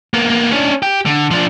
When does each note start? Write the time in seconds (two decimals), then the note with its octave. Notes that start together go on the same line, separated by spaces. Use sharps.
0.14 A#3 B3
0.30 A#3 B3
0.53 C#4 D4
0.82 G4
1.06 D3
1.31 F3 D4